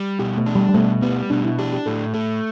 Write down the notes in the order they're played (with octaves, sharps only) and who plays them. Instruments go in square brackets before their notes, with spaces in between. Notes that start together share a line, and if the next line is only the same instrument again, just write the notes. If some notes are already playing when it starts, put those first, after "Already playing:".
Already playing: [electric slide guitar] G3
[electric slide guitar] B2 [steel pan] G4
[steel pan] A3
[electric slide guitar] D4
[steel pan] G3
G3
[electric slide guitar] B2 [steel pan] A3
[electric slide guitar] G3 [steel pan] B3
[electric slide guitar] B2 [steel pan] D4
[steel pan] E4
[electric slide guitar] D4 [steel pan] G4
[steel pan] G4
[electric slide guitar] A2 [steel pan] A4
[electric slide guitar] A3 [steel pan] A4